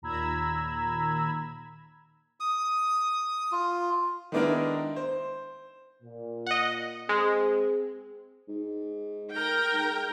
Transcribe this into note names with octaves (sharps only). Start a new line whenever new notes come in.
D#2 A#2 A#5 B5 E6 G#6
D#6
F4
D#3 G#3 B3 D4 E4 A#4
C5
A#2
D#5 F#5
G#3 C4 G#4
G#2
A#4 G5
G#2